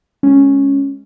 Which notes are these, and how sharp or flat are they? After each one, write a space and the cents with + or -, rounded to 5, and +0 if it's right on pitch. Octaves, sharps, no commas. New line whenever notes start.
G#3 +0 C#4 -5